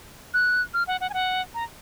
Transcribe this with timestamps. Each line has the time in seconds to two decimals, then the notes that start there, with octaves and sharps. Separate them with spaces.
0.34 F#6
0.74 F6
0.87 F#5
1.01 F#5
1.10 G#5
1.14 F#5
1.54 A#5